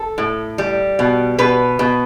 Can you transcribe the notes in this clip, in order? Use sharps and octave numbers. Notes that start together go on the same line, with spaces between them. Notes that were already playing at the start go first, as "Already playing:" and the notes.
Already playing: A4
A2
G3
B2
B2 B4
B2